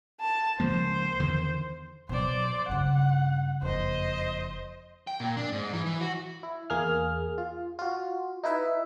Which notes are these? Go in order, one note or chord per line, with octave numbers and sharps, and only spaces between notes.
A5
C#2 F3 A#3 C5
E2 D3 D#3
B2 F#3 C5 D5
G2 C#3 F#5
F#1 F2 C5 D#5
G5
A#2
D4
G#2
E3
E3
F#4
E4
E2 A#3 G#4 F6
F4
F4 F#4
D#4 E4 B4 E5